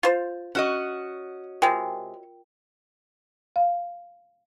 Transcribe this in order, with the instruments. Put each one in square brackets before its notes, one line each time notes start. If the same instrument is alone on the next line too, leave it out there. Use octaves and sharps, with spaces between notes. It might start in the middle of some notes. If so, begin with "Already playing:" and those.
[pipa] F4 C5
[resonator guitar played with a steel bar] C#4 F#4 D#5 [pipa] F#5
[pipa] C3 G#3 [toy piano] F4 A#4 G5
[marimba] F5